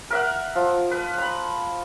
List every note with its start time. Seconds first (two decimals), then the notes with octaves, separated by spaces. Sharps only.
0.10 A#4 E5 F#5
0.55 F3
0.91 B4
1.18 A#5 B5